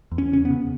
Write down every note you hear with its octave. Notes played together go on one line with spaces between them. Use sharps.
E2
C#4
C#3 C#4
B3
C#3